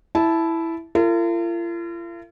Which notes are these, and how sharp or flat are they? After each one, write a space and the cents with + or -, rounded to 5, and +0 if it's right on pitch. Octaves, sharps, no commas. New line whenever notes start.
E4 +0 A5 -15
F4 -45 A#4 -45